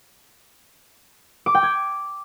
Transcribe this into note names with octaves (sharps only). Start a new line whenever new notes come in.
D6
G5
G#6